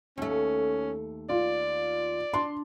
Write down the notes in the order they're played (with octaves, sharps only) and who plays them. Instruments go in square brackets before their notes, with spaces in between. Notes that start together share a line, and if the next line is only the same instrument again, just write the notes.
[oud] D#2 A3 [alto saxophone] C#4
[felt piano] F4 [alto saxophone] D5
[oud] D4 [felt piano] C6